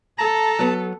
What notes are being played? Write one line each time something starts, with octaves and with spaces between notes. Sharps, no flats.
A4 A5 A#5
F#3 B3